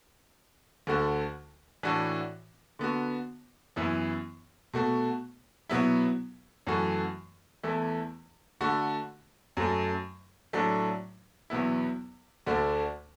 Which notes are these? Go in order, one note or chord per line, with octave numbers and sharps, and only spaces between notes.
D2 D3 A3 F#4
A2 E3 D4 F#4
D3 B3 F#4
F#2 E3 B3 E4
B2 A3 F#4
B2 F#3 B3 E4
F#2 E3 A3 F#4
E2 E3 A3 E4
D3 A3 F#4
F#2 F#3 A3
A2 F#3 A3 D4
E2 B2 F#3 B3 E4
D2 D3 A3 D4 F#4